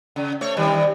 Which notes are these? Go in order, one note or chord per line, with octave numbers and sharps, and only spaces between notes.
C#3
A3 C#5
C3 D#3 G3